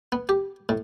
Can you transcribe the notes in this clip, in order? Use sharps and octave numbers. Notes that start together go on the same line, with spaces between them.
B3
G4
A2